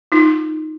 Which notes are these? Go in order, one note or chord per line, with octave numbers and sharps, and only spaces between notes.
D#4 F4